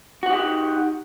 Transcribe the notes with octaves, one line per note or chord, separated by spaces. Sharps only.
D#4 F#4 G4 F#5